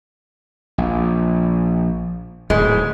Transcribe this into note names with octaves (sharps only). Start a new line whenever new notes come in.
A#1
D1 E2 G#2 G#3